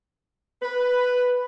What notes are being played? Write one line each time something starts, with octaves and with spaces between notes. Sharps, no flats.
B4